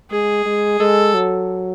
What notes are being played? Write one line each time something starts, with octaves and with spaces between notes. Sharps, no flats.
G#3 G#4
G#3
G#3 A4
F#3